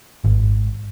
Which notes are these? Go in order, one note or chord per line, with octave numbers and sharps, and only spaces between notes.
G#1